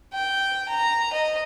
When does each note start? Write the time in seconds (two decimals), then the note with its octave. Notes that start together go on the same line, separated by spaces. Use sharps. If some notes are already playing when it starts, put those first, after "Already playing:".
0.13 G5
0.69 A#5
1.13 D#5